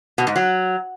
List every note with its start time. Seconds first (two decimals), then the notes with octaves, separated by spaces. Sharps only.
0.18 B2
0.27 G#2
0.36 F#3